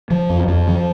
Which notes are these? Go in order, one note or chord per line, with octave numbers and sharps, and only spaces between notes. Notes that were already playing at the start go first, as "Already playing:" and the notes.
F3
F2
F2
F3